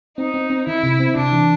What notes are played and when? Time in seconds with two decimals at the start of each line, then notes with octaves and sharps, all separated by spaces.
0.18 C4 D#4
0.34 C4
0.50 C4
0.66 D#3 E4
0.83 C3
1.00 C4
1.16 C3 D4
1.32 E3